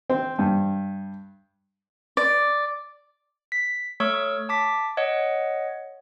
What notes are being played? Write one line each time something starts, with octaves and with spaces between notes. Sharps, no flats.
C4
G2
D5
B6
A3 C#5 C#6 E6 F6
A5 D6 B6
C#5 D#5 F#5